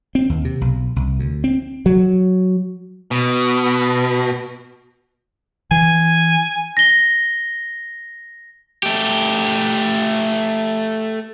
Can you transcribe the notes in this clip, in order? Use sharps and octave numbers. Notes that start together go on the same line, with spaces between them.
C4
D#2
C3
B1
C2
D2
C4
F#3
B2
E3 G#5
A#6 G7
A3 G4